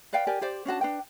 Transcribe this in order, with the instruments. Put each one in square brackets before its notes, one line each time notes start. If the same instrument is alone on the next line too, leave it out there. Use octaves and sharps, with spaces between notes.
[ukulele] B4 D5 F5 G5
G4 A#4 D5 G#5
G4 C5 D5
C#4 D4 F#4 A5
D4 B4 G5